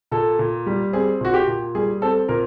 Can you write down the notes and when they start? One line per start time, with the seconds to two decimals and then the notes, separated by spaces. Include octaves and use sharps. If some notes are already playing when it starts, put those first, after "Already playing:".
0.11 A#2 A4
0.39 A#2
0.66 G3
0.93 C4 G#4
1.21 A#2 F#4
1.34 G4
1.47 A#2
1.75 G3 G#4
2.02 C4 A4
2.28 A#2 A#4